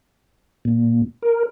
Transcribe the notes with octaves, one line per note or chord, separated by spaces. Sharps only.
A#2
A#4